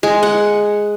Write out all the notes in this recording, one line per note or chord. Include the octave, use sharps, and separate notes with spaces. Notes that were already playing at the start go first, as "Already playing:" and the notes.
G#3
F#5